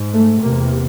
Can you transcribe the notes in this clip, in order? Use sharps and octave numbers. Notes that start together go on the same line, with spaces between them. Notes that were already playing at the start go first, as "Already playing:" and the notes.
Already playing: G#2
A3
E2 C3 A#3